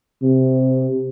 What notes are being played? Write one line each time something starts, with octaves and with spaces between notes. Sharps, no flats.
C3